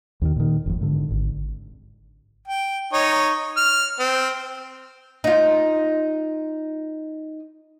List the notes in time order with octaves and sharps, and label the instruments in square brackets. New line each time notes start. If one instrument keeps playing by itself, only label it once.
[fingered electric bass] D#2 D3 D#3
A#2 D#3
F#1 F2
G#2 D3
G#1
[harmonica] G5
D#4 C#5
F6
C4
[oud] D#4 F4